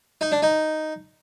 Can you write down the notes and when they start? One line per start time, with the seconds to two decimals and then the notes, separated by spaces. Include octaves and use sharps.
0.21 D#4
0.32 D4
0.42 D#4